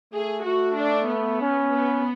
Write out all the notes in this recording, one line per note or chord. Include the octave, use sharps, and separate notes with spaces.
A3 G#4
A3 F#4
D4
B3
C#4
B3